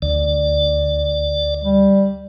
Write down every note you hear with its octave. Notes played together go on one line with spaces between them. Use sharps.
D2 D5
G3